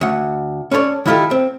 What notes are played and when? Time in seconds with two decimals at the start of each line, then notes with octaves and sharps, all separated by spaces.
0.01 D2 F#5
0.71 C#4 A4 B4 C#5 D5
1.06 D#3 E4 F4 G4 A4
1.31 C4